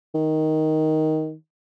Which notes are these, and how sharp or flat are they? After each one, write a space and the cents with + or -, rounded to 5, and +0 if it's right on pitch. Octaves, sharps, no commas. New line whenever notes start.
D#3 +10